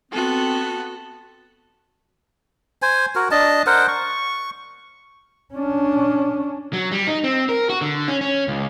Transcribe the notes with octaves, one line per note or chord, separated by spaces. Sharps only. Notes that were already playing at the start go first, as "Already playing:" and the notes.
B3 C4 F#4 A4
C5 G#5
F#4 A#4
D4 D#5 A5
A#4 C5 F#5
C#6
C#4 D4
F#3
G3
D#4
C4
A#4
F#4
D3
C#4
C#4
C#2